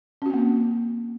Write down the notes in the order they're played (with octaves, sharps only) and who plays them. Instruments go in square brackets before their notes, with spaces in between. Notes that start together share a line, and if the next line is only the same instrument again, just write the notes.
[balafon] C#4
F#4
C4
A#3